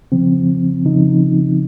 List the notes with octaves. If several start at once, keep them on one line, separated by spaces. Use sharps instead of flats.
C#3 F3 C4
C#3 F3 D#4